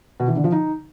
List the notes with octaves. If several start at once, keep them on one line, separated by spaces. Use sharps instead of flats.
B2
E3
D3
F3
D#4